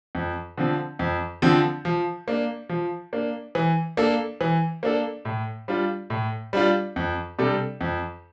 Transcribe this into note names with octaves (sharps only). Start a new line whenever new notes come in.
F2
D3 F3 C4
F2
D3 F3 C4
F3
A#3 D4
F3
A#3 D4
E3
A#3 D4 A4
E3
A#3 D4 A4
A2
G3 D4 F4
A2
G3 D4 F4
F2
C3 G3 D4 A4
F2